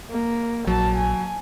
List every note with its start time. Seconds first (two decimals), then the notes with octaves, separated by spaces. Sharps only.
0.10 A#3
0.67 A#1 F#3 A5
0.97 G#5